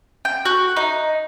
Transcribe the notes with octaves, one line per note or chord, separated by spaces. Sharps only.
G5
F#4
D#4